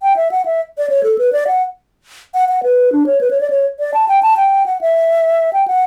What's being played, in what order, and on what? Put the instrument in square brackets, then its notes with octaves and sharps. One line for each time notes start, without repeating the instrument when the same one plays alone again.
[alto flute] G5
E5
F#5
E5
D5
C#5
A4
B4
D5
F#5
F#5
F#5
B4
D4
C#5
B4
C#5
D5
C#5
D5
A5
G5
A5
G5
F#5
E5
G5
F#5